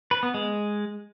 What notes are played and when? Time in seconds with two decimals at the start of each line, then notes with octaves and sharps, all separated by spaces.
0.11 B4
0.23 B3
0.34 G#3